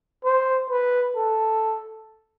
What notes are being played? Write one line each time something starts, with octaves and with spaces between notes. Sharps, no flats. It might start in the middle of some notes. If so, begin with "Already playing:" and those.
C5
B4
A4